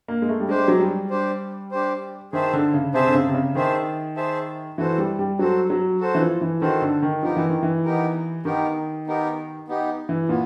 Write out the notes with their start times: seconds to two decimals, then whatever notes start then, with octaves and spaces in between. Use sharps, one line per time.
0.08 A#3
0.22 G#3
0.29 A3
0.40 G3
0.49 G#3 D4 G4 C5
0.68 F#3
0.80 G3
1.10 D4 G4 C5
1.71 D4 G4 C5
2.32 D#3 G#4 C5 E5 A5
2.53 D3
2.74 C#3
2.94 C3 G#4 C5 E5 A5
3.07 D3
3.14 C#3
3.28 C3
3.35 C#3
3.55 D#3 G#4 C5 E5 A5
4.16 G#4 C5 E5 A5
4.78 E3 F#4 A4 C5
4.98 G3
5.19 G3
5.39 F#3 F#4 A4 C5
5.70 F#3
6.00 F#4 A4 C5
6.15 E3
6.20 F3
6.41 E3
6.61 D#3 F#4 A4 C5
6.82 D3
7.02 D#3
7.22 F3 B3 D#4 G4 A#4
7.37 E3
7.50 D#3
7.63 E3
7.84 B3 D#4 G4 A#4
8.45 D#3 B3 D#4 G4 A#4
9.07 B3 D#4 G4 A#4
9.68 B3 D#4 G4
10.09 E3
10.29 A#2 B3